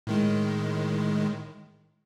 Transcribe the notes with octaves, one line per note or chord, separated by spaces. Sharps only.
A2 D#3 G#3